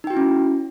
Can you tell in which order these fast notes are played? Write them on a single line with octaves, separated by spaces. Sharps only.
D#4 G5 F#4 E4 C#4